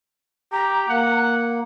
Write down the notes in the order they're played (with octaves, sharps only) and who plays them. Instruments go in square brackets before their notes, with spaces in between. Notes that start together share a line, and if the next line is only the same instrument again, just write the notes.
[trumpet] G4 [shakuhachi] A#5
[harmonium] A#3 [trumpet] F#5